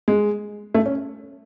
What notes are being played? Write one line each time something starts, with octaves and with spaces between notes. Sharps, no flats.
G#3
A3
C#4